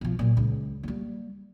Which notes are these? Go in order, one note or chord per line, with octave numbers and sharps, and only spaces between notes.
B2 F3
A#2 F#3
C#2
G3 A#3